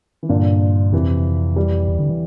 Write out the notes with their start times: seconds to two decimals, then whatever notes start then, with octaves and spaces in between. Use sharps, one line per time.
0.23 E3
0.29 G2 A#2 D3
0.93 F2 C3 E3
1.56 E3 G3
1.88 E2
1.99 D3
2.09 E3